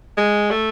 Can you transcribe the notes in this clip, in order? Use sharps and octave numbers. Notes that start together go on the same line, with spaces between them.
G#3
A3